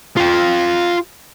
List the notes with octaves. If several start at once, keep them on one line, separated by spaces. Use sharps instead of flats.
F4 G5